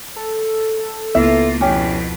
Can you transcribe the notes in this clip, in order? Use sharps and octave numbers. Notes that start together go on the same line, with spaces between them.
A4
C#2 A#3 B3 E4 F4 E5
F2 B2 C#4 G4